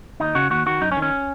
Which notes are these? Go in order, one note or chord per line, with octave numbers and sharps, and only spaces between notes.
D#2 D#4
C#3 F#4
D#2 F#4
D#3 F#4
F#2 D#4
C#4
D#3
C#4